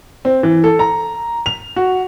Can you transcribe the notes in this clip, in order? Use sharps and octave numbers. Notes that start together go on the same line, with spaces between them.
C4
E3
A4
A#5
F7
F#4